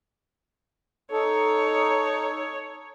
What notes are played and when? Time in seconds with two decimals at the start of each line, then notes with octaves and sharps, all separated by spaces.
1.11 D#4 A4 C#5